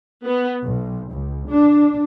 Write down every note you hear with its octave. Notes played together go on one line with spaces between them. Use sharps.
B3
B1
C#2
D4